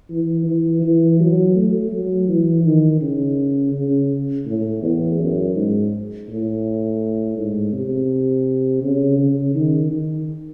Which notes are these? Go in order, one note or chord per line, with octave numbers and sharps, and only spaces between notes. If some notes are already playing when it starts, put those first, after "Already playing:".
E3
E3
E3
F#3
A3
F#3
E3
D#3
C#3
C#3
A2
E2
F#2
G#2
A2
G#2
C3
C#3
C#3
D#3
D#3